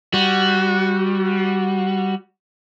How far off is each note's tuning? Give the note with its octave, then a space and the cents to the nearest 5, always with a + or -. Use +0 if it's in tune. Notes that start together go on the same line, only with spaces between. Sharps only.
G3 -10 F#4 +0